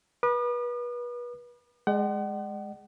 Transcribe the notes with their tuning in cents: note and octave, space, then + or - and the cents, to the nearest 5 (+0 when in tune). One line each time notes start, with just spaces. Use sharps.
B4 -30 D#6 -45
G#3 +0 D5 +45 F#5 +40